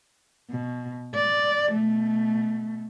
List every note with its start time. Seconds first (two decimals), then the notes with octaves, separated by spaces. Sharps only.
0.50 B2
1.14 D5
1.72 B2 A3